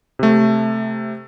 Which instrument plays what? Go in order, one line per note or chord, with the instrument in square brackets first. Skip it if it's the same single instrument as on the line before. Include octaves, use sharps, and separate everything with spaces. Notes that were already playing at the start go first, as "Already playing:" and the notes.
[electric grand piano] C3 A3